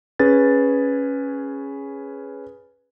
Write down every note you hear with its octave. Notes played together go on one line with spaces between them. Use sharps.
C#4 G#4 B4 A6